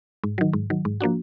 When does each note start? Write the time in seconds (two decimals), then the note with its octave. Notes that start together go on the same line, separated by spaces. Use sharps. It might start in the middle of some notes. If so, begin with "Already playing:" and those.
0.24 G#2
0.38 D#3 F#3
0.53 G#2
0.70 D#3 F#3
0.85 G#2
1.01 F3 A#3 D4 F#4